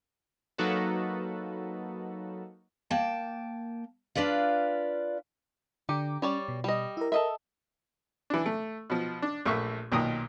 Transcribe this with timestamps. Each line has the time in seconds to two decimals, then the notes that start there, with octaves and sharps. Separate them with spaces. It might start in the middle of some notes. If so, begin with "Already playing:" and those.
0.58 F#3 A#3 D#4 F#4 A4 B4
2.91 A#3 G5 A5
4.15 D4 F4 B4 D5 F5
5.89 D3 G4 A#5 D6
6.22 G3 C#4 C#5 D5
6.48 B2
6.64 G3 D#5
6.97 E4 A#4
7.12 A4 A#4 D#5 E5
8.30 E3 D4
8.46 A3
8.90 B2 F3
9.22 D4
9.45 A#1 A3 A#3 E5 C#6
9.92 B1 A#2 D#3 A#5 D#6